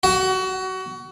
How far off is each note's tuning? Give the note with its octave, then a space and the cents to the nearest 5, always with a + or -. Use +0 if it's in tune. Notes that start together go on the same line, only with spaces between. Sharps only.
F#4 +25